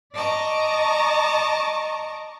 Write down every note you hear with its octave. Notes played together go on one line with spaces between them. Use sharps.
D5 D#5 A5 A#5 C#6